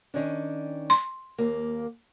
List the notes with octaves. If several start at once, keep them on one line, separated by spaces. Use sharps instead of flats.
D#3 C#4 D4
C6
D#2 A#3